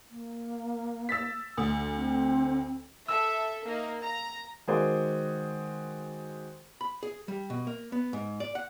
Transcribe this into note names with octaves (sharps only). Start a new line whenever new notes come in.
A#3
E6 A6 B6
D2
C4
A4 E5 E6
A#3 D#4
A#5
D#3 G#3 F#4 G#4 C5 D5
B5
G#4
G3
B2
A#3
B3
G#2
D5
F#5